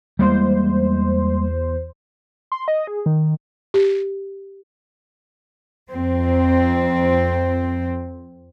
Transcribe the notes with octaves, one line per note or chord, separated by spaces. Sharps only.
E2 G3 G#3 A#3 C5
C6
D#5
G#4
D#3
G4
F2 C4